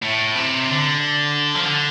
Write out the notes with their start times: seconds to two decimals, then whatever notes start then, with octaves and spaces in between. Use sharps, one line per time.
0.03 A2
0.35 C3
0.67 D3
1.55 F3
1.65 D3